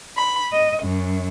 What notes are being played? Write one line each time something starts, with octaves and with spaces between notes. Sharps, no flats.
B5
D#5
F#2